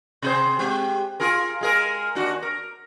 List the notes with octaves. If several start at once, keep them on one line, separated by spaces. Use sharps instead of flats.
C3 G#4 C5
G#3 C4 G4
F4 G#4 A#4
G#3 G#4 A#4
D#2 D4 F#4
A#4